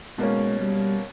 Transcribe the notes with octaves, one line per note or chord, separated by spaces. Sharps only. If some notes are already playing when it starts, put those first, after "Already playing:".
B2 G#3 A#3 C#4
G3